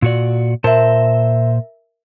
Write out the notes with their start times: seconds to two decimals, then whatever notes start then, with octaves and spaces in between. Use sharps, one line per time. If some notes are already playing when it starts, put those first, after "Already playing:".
0.02 A#2 F#4 D5
0.64 A#2 A#4 C5 E5 A5